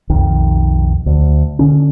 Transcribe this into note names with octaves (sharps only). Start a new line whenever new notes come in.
B1 F2 D#3
D2
D3 C#4